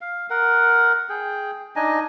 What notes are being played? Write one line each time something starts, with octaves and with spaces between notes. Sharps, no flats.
F5
A#4 F#5
G#4 G5
D4 D#4 D#5 G#5